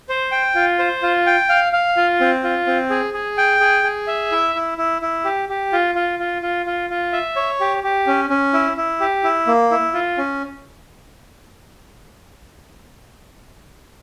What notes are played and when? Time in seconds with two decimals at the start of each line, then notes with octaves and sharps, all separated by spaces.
0.09 C5
0.32 G5
0.55 F4
0.79 C5
1.03 F4
1.27 G5
1.49 F5
1.73 F5
1.97 F4
2.20 C4
2.44 F4
2.67 C4
2.90 G#4
3.14 G#4
3.38 G5
3.60 G#4
3.84 G#4
4.07 E5
4.32 E4
4.55 E4
4.78 E4
5.02 E4
5.25 G4
5.49 G4
5.72 F4
5.95 F4
6.19 F4
6.42 F4
6.66 F4
6.90 F4
7.13 E5
7.36 C#5
7.60 G4
7.84 G4
8.07 C#4
8.30 C#4
8.53 E4
8.77 E4
9.00 G4
9.24 E4
9.47 A#3
9.71 E4
9.94 F4
10.18 C#4